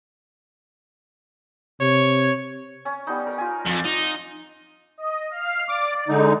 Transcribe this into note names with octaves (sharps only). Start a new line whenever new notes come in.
C3 C#5
C#4
G3 B3 D#4
A#4
F4 G#5
F2 F4 D6
D#4
D#5
F5 F6
D5 D6
D3 G#3 D#4